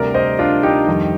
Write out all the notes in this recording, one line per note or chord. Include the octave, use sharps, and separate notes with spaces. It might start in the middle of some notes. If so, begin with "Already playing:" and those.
Already playing: D2 C3 G3 A#4 D5
C5 D#5
D4 F4
D#4 G4
F2 D#3 G3